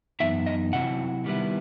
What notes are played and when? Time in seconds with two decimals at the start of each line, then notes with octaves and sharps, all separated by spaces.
0.20 F#2 E3 B3 D#4 E5
0.46 D#5
0.73 C3 F#3 C4 E4 F#5
1.25 D#3 G3 B3 E4